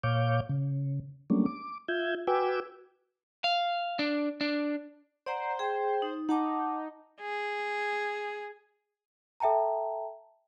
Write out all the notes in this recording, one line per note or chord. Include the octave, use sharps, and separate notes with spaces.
A#2 C#5 F5 D6 G6
C#3
F#3 G3 A3 A#3 C#4 D4
D6
F4 E5 G6 G#6
F#4 B4 G5 G#5 D6 E6
F5
D4
D4
C5 D5 F#5 A#5
G#4 G5
D#4
D#4 F#5 A5 D6
G#4
A4 E5 G5 A5 A#5